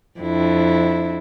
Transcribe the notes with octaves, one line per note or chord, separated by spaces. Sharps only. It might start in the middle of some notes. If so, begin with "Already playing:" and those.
F2 D4 E4